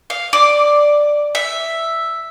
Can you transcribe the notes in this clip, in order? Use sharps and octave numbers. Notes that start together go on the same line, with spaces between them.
F5
D5
E5